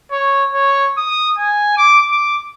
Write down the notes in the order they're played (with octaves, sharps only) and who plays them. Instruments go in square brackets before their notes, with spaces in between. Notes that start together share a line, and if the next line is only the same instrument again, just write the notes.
[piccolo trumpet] C#5
C#5
D#6
G#5
D6
D6